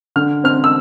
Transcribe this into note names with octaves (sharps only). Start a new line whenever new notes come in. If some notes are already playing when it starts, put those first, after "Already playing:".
D3 F6
C4 F6
E6